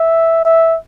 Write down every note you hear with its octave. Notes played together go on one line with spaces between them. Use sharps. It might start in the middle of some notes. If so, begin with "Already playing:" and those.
Already playing: E5
E5